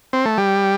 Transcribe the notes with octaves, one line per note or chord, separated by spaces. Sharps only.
C4
A3
G3